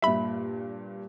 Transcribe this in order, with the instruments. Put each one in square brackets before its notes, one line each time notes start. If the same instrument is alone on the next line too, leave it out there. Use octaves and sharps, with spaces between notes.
[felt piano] G2 A#2 [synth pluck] E5 B5